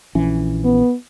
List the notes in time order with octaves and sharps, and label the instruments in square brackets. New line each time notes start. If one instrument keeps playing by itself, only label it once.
[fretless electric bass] A#1 E3 C#4
[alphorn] B3